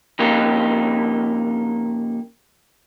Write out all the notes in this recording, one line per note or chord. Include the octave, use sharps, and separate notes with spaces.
F2 C#3 A#3 D#4 G4